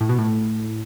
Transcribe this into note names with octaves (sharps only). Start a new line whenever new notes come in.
A2
B2
A2